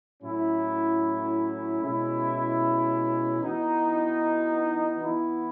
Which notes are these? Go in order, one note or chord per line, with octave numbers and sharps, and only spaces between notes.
A2 F#3 C#4 E4
B2 G#3 C#4 E4
E3 B3 D#4 F#4
E3 B3 E4